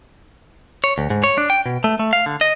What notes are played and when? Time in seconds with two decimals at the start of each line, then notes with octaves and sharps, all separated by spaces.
0.84 C#5
0.98 D2
1.10 G#2
1.24 C#5
1.38 D4
1.50 G5
1.66 B2
1.84 A3
1.99 A3
2.13 F5
2.26 D3
2.41 D#5